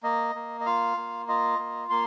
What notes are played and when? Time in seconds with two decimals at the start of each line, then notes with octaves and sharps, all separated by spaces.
0.03 A#3 D#5
0.35 A#3
0.61 D#5
0.66 F4 F5
0.97 A#3
1.28 F4 D#5
1.59 A#3
1.90 A#3 C6